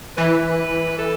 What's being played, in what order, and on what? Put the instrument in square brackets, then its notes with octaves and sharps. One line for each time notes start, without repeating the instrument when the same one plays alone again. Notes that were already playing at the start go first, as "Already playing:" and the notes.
[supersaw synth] E3 [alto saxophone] B4
[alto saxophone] A4